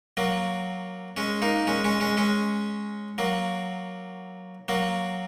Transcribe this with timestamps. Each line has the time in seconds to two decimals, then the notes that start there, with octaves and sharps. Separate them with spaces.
0.17 F#3 A#3
1.17 G#3 C#4
1.42 A#3 D#4
1.67 G#3 C#4
1.84 G#3 C#4
2.00 G#3 C#4
2.17 G#3 C#4
3.18 F#3 A#3
4.68 F#3 A#3